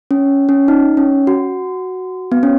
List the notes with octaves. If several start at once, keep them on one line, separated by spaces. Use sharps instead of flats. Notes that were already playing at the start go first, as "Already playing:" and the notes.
C#4
C#4
D#4
C#4
F#4
B3
C#4